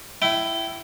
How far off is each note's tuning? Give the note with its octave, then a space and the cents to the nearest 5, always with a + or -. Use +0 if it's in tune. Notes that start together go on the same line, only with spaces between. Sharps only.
E4 +10 G5 -25